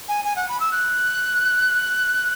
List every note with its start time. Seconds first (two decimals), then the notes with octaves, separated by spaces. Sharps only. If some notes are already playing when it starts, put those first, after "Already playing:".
0.09 G#5
0.25 G#5
0.36 F#5
0.49 B5
0.60 E6
0.72 F#6